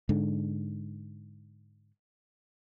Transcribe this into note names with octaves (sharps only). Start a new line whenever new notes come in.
G#2 D3